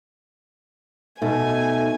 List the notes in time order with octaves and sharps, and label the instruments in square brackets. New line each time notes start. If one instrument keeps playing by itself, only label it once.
[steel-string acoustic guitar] B2 [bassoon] A3 [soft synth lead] D#4 [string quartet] G#5